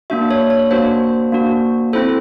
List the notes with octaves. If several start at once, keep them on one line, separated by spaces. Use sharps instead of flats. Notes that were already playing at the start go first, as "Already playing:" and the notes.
A#3 D4 F#4 E5
C#5
C#5
A#3 D4 F#4 C5
A#3 D4 F#4
C4 E4 A4 C5